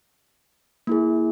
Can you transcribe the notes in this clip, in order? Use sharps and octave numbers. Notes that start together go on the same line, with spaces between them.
A#3 E4 G#4